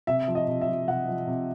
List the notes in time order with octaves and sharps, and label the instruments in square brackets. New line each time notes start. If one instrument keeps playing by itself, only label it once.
[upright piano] C3 E5
F3
D#5
C3
E5
F3
C3 F#5
F3
C3